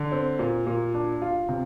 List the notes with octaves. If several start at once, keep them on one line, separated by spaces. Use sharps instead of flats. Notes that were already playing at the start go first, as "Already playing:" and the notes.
Already playing: D3
C4
A#2
A#2
D4
F4
C3